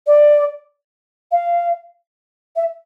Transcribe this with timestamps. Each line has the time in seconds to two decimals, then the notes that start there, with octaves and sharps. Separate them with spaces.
0.06 D5
1.31 F5
2.56 E5